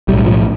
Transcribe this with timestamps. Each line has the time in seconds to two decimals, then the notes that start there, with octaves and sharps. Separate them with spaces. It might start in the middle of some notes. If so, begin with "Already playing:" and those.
0.08 B1 A2 G3
0.25 F3